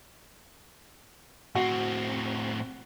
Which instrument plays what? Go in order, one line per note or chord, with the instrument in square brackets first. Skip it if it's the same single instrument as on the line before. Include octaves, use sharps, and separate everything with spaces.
[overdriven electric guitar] A2 C4 [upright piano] F#4